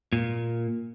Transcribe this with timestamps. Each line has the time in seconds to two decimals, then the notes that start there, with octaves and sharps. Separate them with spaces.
0.13 A#2